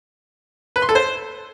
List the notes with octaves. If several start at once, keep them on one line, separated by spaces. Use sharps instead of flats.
B4
C6
A4
C5